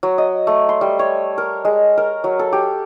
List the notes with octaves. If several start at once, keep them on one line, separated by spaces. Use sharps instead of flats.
F#3
D#5
A3
C6
G3
C#5
A#4
G#3
A#4
F#3
A4
G4